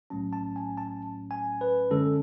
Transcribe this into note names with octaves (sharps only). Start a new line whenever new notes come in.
B1 A2 F#3 A3 C#4 A5
A5
G#5
A5
G#5
B4
F#2 D3 G#3 C#4 A4